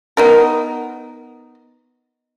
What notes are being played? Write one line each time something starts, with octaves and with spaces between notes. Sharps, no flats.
B3 D#4 A#4